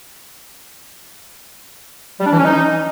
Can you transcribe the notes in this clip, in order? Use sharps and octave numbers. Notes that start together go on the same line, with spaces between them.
G3
D4
E3
C#4
D#4